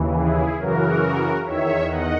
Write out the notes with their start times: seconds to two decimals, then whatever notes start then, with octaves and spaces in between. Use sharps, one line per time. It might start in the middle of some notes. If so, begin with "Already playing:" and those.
Already playing: D#2 C#3 E3
0.16 E4 G#4
0.59 F#2 C#3 E3 F#4 A#4
1.45 E2 D#3 C#5 E5
1.88 D#5 F#5